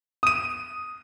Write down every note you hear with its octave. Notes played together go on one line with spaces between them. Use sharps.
D#6 D#7